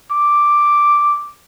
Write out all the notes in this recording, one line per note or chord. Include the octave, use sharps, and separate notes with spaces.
D6